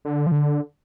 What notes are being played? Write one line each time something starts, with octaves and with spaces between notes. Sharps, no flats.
D3
F3
D3